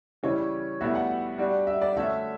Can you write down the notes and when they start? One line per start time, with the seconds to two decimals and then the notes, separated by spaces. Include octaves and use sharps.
0.23 C#3 E3 G3 C#4 E4 C#5
0.81 A2 G3 B3 F#4 E5
0.95 F#5
1.38 G3 D4 F#4
1.67 E5
1.81 D5
1.96 D3 A3 C#4 F#4 E5